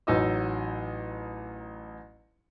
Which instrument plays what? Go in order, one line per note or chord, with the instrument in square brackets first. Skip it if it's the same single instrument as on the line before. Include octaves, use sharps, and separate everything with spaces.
[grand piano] A1 F#3 D#4 D#5 E6